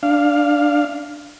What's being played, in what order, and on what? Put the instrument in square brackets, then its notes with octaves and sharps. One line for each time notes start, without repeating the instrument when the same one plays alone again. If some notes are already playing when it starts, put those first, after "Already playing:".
[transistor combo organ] D4 F5